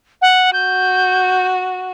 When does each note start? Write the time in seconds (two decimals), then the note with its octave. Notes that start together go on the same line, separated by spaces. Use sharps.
0.22 F#5
0.53 F#4 G6